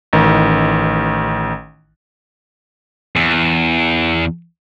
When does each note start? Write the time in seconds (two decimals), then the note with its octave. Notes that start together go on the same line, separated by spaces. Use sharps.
0.13 A1 D#3
3.16 E2